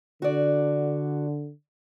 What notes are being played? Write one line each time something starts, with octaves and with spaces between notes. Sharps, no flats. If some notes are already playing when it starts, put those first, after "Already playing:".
D3 F#4 D5